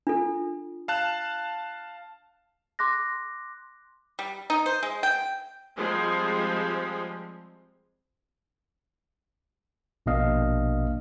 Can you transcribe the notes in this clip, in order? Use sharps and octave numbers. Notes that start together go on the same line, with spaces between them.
D4 F4 A4
F5 A5 F#6
C6 D6 F#6 A#6
G3
D#4
C5
G#3
G5
F3 G3 G#3 C4
A#1 B2 A#3 D4 D#5 F5